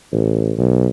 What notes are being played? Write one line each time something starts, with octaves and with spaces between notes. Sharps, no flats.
A1
B1